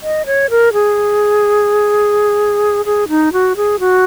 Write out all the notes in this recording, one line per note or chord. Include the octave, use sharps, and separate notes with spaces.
D#5
C#5
A#4
G#4
G#4
D#4
F#4
G#4
F#4